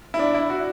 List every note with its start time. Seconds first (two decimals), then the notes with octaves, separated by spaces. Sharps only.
0.14 E4
0.19 D4
0.34 E4
0.50 F#4